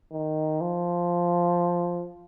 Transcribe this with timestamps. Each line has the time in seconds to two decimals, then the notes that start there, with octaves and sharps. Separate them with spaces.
0.12 D#3
0.61 F3